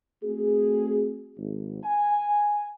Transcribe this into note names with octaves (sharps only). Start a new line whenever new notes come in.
A3 C4 F#4 G#4
G#1
G#5